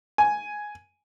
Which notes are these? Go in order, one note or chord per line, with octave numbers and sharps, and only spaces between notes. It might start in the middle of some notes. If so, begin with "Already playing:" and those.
G#5